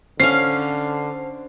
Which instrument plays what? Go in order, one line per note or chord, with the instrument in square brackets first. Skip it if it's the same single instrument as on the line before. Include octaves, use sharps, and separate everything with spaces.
[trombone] D3 [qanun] C#4 F5 [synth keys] C5 [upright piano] C7